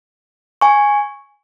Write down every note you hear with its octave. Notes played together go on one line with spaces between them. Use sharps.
G#5 C#6